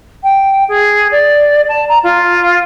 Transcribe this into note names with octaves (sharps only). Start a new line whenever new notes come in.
G5
G#4
D5
A5
A#5
F4